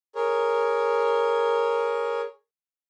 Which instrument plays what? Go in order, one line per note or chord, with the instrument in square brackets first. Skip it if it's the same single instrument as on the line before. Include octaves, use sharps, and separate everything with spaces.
[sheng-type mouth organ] G#4 A#4 C#5